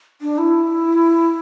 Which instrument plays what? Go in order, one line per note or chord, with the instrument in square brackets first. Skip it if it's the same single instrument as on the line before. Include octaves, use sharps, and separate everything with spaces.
[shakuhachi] D4
E4